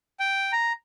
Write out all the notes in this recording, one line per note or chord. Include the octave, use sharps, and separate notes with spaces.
G5
A#5